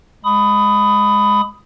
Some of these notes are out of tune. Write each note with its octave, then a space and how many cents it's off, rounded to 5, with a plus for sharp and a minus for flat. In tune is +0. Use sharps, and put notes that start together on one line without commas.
G#3 +0 B5 +15 D#6 +0